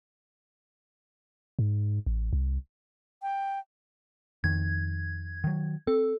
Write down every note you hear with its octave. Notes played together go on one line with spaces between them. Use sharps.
G#2
A1
C2
G5
F2 D#3 G#6
D#3 F#3
C4 A4